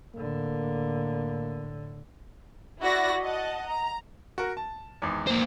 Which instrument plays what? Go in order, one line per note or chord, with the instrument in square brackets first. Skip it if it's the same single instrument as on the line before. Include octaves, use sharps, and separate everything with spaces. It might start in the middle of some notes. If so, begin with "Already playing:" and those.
[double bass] A2 D3 [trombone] A#3
[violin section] E4 F#4 D5 A#6
D#5 F#5 A5
A#5
[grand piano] F#4 A#4
A5
G#1 E2
[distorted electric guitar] A#3 C5